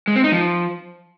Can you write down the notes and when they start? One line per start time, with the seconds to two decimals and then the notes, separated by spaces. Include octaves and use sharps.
0.08 G#3
0.16 C4
0.24 D#4
0.32 F3